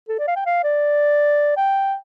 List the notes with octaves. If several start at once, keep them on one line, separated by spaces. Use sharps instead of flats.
A4
D5
F5
G5
F5
D5
G5